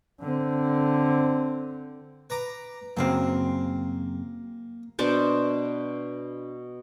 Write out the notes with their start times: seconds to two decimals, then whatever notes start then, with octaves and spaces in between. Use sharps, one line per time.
0.21 D3 C4
2.30 B4 A#5 D6
2.97 F#2 C#3 A#3 C4
4.99 B2 D4 C5 A5